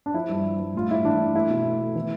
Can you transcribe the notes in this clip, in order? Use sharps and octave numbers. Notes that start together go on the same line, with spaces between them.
D4
F3 E4
G2
F3
G2
A2 F4
A2 E4
E3 D4
E3
A3 E4
B2
A3
A3
E3